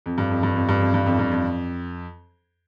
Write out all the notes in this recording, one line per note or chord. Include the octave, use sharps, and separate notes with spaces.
F2
G2
F2
G2
F2
G2
F2
G2
F2
G2
F2